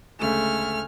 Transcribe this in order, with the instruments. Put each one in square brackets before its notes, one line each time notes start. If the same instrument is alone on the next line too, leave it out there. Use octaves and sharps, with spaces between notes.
[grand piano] D2 C#3 G#3 [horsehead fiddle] A3 [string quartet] G#5 F6